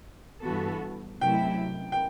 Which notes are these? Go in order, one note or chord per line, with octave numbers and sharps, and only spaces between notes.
G2 E3 B3 F#4 A4
C3 F#3 A3 E4 G5
G5